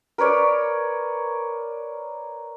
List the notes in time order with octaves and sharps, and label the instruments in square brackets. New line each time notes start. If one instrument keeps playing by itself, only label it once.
[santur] A#4 B4 C#5 D5